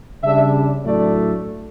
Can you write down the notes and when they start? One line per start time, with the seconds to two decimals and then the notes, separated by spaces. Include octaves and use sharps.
0.23 C#3 G3 D4 E5
0.85 A2 F#3 A3 D4 D5